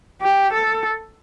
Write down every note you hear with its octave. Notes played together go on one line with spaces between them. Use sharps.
G4
A4